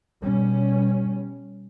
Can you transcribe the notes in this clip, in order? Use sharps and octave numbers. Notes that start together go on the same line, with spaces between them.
B2 G3 C#4